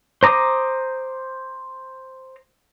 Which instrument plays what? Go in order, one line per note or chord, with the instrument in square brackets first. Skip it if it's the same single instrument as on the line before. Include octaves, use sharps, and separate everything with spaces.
[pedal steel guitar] C5 A#5 D6 D#6